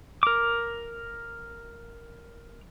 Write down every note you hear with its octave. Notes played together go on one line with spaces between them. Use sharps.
A#4 D6